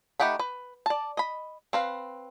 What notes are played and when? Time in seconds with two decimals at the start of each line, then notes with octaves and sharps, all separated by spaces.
0.20 A3 D#4 G4 F#5 B5
0.39 B4
0.86 D5 A5
1.17 D#5 B5
1.73 C4 B4 F5